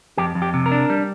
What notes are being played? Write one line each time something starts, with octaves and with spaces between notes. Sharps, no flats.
F2 G4
F2
G4
C3
A#4
D4
G3